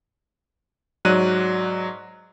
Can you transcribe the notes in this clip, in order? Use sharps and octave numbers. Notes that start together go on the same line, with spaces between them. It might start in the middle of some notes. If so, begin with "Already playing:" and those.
G#2 F#3 D5 F#6 D#7